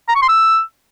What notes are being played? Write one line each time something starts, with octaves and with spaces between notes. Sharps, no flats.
A#5
C#6
C6
E6